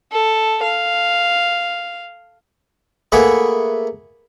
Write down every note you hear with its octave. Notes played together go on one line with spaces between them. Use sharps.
A4
F5
A3 A#3 G#4 B4 E5 F#5